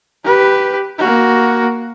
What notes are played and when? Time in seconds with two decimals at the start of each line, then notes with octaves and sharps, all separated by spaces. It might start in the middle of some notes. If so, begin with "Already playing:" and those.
0.24 G4 B4
0.98 A#3 F#4